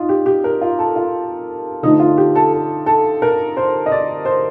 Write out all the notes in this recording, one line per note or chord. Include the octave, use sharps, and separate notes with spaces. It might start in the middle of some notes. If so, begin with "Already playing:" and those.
Already playing: D#4 F4
G4
G4
A#4
F4
A4
F4
D3 F3 A3 D#4
F4
G4
A4
A4
A4
A#4
C5
D#5
D5
C5